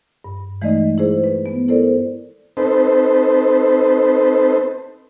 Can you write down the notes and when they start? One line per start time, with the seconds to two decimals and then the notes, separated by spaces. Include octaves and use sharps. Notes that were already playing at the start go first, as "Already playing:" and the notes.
0.24 G2
0.62 E3 G#3 A3 D#4 D5 D#5
0.98 E4 G#4 C5
1.24 B4
1.46 B3
1.68 E4 A4 A#4 C5 D5
2.57 C4 D#4 A4 B4 C5